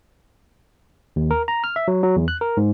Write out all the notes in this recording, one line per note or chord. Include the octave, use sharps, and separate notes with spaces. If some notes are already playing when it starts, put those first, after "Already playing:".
D#2
A#4
A#5
F6
E5
F#3
F#3
E2
F#6
A#4
G#2